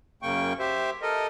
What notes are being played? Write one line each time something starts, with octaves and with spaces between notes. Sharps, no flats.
F#2 C#3 A#3 G5 C#6
G4 C5 E5
A4 A#4 D#5